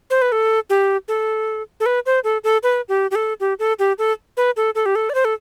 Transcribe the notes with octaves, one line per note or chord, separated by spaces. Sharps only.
C5
B4
A4
G4
A4
A4
B4
C5
A4
A4
B4
G4
G4
A4
G4
A4
G4
A4
B4
A4
A4
G4
A4
D5
C5
A4